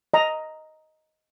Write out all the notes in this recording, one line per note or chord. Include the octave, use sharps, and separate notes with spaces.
D#5 A#5